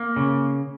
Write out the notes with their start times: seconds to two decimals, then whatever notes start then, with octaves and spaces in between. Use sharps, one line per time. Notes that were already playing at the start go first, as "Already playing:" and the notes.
Already playing: A#3
0.16 C#3